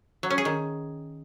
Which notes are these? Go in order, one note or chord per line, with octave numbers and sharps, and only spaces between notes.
F#3
C#4
G#4
D#3